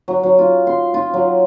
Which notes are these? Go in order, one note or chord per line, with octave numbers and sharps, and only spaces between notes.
F#3
F#3
F4
C6
F4
F#3